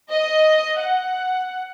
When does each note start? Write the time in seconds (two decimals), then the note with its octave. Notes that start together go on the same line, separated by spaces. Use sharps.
0.11 D#5
0.79 F#5